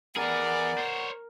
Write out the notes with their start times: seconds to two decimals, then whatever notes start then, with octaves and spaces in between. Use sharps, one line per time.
0.16 E3 B3 G#4 A#4 D5 F#5
0.78 C5 C#5